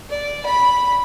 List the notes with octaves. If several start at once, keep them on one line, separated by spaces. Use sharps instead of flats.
D5
B5